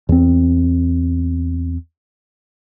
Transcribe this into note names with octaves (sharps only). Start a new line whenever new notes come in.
E2 C4